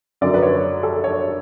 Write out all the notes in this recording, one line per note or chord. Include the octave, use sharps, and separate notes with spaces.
F#2 D3 F#3 D5
B4
C#5
A4
C#5